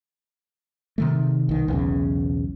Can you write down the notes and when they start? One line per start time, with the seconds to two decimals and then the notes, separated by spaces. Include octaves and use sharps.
0.98 C3 D#3 A3
1.49 B1 D#3
1.68 B1 E2 C#3